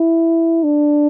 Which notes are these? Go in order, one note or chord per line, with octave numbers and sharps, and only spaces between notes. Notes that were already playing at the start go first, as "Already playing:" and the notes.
Already playing: E4
D4